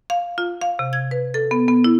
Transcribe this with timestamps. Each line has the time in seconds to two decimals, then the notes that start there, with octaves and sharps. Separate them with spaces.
0.10 F5
0.38 F4
0.62 F5
0.79 C3
0.93 G#6
1.11 B4
1.34 A4
1.51 B3
1.68 B3
1.84 E4